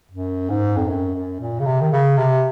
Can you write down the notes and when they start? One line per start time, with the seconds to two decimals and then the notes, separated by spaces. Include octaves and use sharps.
0.11 F#2
0.49 G#2
0.77 F2
0.88 F#2
1.14 F#2
1.40 A#2
1.60 C#3
1.66 C3
1.81 D#3
1.91 C#3
2.17 C3